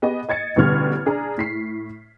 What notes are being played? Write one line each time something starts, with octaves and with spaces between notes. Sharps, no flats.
B3 G4 G#4 D#5
D#5 G#6 A6 C#7
A1 B2 D3 G3 F6 G#6
D4 G#4 D5 A#5
A2 B6 C7